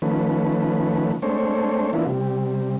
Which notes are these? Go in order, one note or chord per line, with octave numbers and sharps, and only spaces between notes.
D#3 F3 A3 C#4 B4
G#3 A3 C4 D4 C5 C#5
E3 A#3 B3 D4 E4 F4
C3 G3